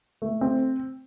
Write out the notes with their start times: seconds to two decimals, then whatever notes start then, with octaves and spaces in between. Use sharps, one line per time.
0.22 A3
0.41 C4